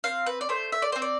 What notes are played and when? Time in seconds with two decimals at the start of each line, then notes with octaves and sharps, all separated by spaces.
0.04 C4 F5
0.26 B4
0.41 D5
0.49 A3 C5
0.72 E5
0.82 D5
0.92 C4 C5
1.02 D5